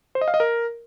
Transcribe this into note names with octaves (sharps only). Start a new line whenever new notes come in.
C5
D#5
F5
D#5
A#4